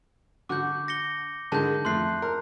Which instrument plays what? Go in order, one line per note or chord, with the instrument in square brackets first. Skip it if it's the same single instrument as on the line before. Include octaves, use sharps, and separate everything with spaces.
[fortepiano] D3 F#4 [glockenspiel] D6 G6
[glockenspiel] A#6 C#7 G7
[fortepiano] D3 D#3 G#3 [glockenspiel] A5 G6
[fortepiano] F2 A3 [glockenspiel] C6 F#6 C7
[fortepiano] A#4